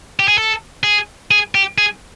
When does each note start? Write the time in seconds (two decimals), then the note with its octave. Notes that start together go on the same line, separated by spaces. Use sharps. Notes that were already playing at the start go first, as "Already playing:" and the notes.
0.19 G4
0.28 G#4
0.38 A4
0.84 G#4
1.31 G#4
1.55 G4
1.78 G#4